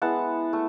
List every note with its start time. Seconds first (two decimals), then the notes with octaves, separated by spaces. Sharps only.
0.02 G#3 B3 E4 F#5 A5
0.53 A3